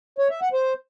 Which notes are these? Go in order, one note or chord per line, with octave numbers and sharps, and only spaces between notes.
C#5
E5
F#5
C5